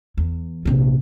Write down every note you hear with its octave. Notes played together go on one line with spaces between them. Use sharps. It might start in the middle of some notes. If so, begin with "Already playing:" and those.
E2
A#1 C3